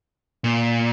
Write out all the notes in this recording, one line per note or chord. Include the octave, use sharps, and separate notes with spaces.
A#2